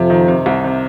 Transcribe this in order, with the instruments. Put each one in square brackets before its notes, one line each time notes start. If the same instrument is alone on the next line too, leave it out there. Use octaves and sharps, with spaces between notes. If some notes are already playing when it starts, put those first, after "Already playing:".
Already playing: [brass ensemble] F2 F3 [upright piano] C3
[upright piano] D#3
C3
C2
C3